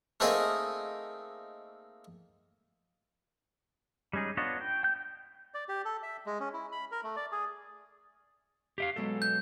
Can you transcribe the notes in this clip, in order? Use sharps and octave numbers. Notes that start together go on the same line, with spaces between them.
A3 A#3 C4 D#4 G#4 A#4
G3 G#3 C#4 D#4 G#4
B3 D4 F4 C#5 D#5
G5
G5 G6
D5
G4
A4
E5
G#3
C#4
E4
B5
A#4
A3
D5
G#4
G4 E5 F5
B2 F#3 G#3 A4
G6